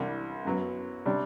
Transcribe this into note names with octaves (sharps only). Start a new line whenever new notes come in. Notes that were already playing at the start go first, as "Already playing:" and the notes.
Already playing: C2 C3 E3 G3 D4
F#2 F#3 B3
C3 G3 D4